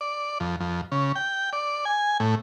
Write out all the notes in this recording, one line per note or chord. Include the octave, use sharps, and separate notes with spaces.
D5
F2
F2
C#3
G5
D5
G#5
A2